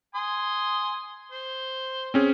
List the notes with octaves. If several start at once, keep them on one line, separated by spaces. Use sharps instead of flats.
G#5 C6 D#6
C5
C4 C#4 G#4